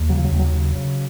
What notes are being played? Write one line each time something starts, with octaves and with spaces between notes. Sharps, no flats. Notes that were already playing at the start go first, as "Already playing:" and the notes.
Already playing: D#2
C#3 F#3
F3
F#3
D#2
F#3
C#3
C#3